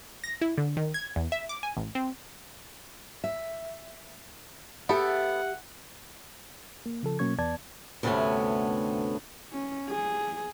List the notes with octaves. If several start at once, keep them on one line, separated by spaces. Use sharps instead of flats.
A#6
E4
D3
D#3
G#6
E2
E5
D6
G#5
A1
C4
E5
B3 G4 A4 E5 F#5
A#3
C#3 F3 A4
B2 F#3 A#3 C#4 C#6 G#6
E2 B3 D5 A5 G#6
D2 G2 C3 A3 B3 C#4
C#4
G#4